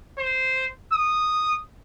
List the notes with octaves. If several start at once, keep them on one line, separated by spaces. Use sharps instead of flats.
C5
D#6